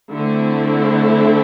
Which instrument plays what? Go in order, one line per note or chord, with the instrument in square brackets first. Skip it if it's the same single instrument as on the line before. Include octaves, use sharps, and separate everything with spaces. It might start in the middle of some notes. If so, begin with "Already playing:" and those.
[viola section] D3 A3 C4 E4